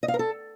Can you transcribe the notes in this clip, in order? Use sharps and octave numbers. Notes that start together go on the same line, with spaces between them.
D#5
F5
A#4
A4